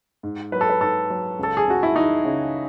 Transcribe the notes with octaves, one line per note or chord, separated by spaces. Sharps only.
G#2
F#3 B4
A4
B4
G#2 A4
F#3
C#2 A4
G#4
C#2 F#4
E4
E3 D#4
C#3